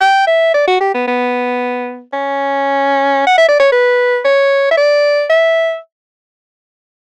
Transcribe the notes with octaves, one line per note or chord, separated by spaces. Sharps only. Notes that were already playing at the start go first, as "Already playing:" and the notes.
G5
E5
D5
F#4
G4
B3
B3
C#4
F#5
E5
D5
C#5
B4
C#5
E5
D5
E5